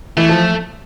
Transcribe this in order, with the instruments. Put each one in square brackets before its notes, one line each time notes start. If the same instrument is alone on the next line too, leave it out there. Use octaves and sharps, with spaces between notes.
[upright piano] E3 [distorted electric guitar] A3
[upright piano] F3